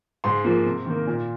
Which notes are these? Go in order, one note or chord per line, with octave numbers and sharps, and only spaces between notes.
G#2 C6
F3 A#3
C3
D#3 A#3
A#2